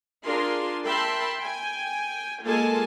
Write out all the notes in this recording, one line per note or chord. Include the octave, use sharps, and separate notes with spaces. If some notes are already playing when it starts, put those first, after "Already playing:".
D4 F4 G#4 A#4 C6
A#4 E5 G5 A5 B5 C6
G5 G#5
G#3 A#3 F4 A4 G#5 A5